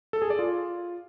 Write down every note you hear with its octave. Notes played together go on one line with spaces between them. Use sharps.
A4
G#4
D5
F4